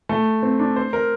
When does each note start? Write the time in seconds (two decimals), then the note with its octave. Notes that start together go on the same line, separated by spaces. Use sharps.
0.09 A3
0.42 C4
0.59 D4
0.76 C5
0.93 A#4